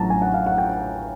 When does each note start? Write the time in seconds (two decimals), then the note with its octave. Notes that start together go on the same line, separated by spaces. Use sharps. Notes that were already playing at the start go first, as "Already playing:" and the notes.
Already playing: A1 A2 F#3 A5 A#5
0.10 G#5
0.22 F#5
0.34 F5
0.46 F#5
0.58 G5